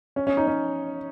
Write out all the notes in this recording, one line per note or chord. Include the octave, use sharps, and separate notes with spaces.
C#4
C#4
D#4
C#4